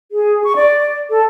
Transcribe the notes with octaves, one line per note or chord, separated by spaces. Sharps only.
G#4
C#6
D5
A4